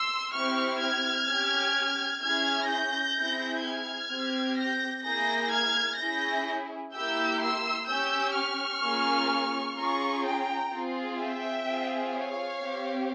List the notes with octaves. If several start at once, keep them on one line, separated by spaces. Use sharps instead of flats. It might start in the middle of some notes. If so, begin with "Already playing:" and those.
Already playing: C6 E6
C4 E4 G4 C#6 F6
F6 G#6
C#4 G4
C#4 E4 G#4 F6 G#6
G6 A#6
C4 E4 G#4
F6 G#6
C4 G4
G6 A#6
A#3 E4 G#4 G6 A#6
F6 G#6
C#4 E4 G#4 G6 A#6
A#3 E4 G4 E6 G6
C6 E6
C#4 G4 E6 G6
C#6 F6
A#3 C#4 F4 G#4
C#4 F4 G#4 A#5 C#6
G5 A#5
C4 F4 G#4
E5 G5
C4 F4 G#4
C#5 F5
C4 G4